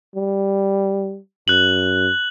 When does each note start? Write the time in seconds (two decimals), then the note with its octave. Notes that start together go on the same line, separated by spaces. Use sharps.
0.16 G3
1.48 F#2 F#6 F#7